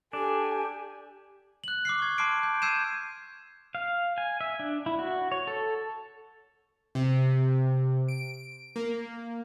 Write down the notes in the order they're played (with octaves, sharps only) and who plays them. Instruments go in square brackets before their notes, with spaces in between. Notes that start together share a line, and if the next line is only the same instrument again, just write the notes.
[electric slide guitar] D4 [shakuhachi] G4 [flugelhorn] A4 [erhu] G#5
[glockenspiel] F#6 F#7
D6 F6 C7
C#6 G#6
A5 C6 D6 F6 C7 D7
G6
E6 G6 G#6 C7 D#7 E7
[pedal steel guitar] F5
G#5
E5
D4
E4
F#4
C#5
A4
[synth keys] C3
D7
A#3